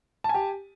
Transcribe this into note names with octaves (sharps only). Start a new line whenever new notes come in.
G4 G#5 A5